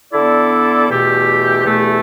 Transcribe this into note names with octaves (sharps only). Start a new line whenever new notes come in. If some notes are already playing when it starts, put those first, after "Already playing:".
D3 B3 E4 A4 D5
E2 B2 A3 G4
E2 B2 A3 G4